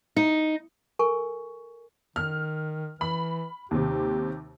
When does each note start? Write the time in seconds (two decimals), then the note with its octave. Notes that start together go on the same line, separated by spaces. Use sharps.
0.16 D#4
0.99 A4 A#4 G#5 C#6
2.16 D#3 F6
3.01 E3 B5
3.71 D#2 C3 G4